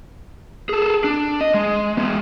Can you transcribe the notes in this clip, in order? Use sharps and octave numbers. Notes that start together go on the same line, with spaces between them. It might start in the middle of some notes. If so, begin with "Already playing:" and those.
G#4 A4
D4
D#5
G#3
G#3 B3